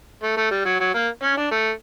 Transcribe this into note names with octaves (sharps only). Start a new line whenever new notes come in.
A3
A3
G3
F#3
F#3
A#3
C#4
D4
A3